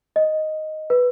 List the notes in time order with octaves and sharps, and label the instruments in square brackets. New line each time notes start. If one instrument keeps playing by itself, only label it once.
[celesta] D#5
B4